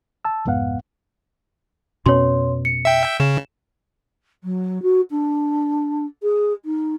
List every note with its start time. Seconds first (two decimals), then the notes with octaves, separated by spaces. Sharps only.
0.25 A5 E6
0.45 C2 F2 G#2 B3 F5 F#5
2.06 F2 B2 C#4 C#5 C6
2.65 C#7
2.85 E5 G5
3.20 C#3 E7
4.44 F#3
4.82 F#4
5.10 D4
6.23 G#4
6.65 D#4